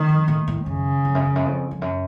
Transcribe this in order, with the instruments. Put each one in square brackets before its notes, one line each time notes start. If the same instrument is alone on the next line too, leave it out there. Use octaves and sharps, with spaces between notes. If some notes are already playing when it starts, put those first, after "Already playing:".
Already playing: [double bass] D#3
[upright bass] F2
A2
A2
[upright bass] F#2 [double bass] C#3
[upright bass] F2
F#2
F2
F#2
F2
F2
F#2